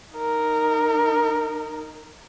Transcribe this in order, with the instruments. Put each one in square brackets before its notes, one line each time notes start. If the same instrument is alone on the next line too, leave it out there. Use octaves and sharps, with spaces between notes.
[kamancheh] D#4 A#4